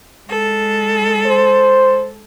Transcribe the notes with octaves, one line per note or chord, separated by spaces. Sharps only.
G#3 A4
C5